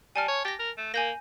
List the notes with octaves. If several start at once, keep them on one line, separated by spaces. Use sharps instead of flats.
G3 G#5 A5 F6
C#5
G4 A6 A#6
A#4
A3
A#3 G#5 G6 A#6